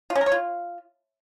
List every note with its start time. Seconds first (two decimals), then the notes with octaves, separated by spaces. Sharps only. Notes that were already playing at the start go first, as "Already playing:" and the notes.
0.10 F4
0.15 C#4
0.21 A#4
0.26 C#5
0.32 F4